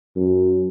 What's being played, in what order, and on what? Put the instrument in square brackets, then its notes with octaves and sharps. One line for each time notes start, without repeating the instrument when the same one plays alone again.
[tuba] F#2